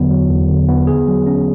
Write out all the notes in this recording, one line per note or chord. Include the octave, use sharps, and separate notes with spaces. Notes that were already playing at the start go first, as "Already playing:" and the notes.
Already playing: E2 D3 F#3 B3
F#3
E2
D3
B3
G#4
F#3
C#4